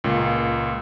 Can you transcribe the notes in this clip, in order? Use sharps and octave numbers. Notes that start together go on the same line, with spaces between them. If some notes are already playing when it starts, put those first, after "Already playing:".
C#2 A#2